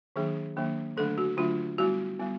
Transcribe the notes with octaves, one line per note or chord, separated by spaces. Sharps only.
D#3 F#3 A#3 D4 G#4
D#3 F#3 A#3 D4
D3 F#3 A3 D4 A4
F#4
D3 F#3 A3 D4 F4
G3 B3 E4 F#4
G3 B3 E4